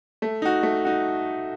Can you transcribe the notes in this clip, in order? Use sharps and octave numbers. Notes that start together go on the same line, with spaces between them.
A3
D#4 F#4
A3
D#4 F#4